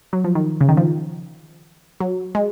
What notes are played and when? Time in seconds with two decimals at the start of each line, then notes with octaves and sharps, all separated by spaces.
0.13 F#3
0.24 F3
0.35 D#3
0.61 C#3
0.68 D#3
0.77 F3
2.00 F#3
2.35 G#3